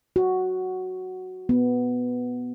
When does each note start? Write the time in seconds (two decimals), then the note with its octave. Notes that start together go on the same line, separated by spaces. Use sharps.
0.16 F#4
1.49 B3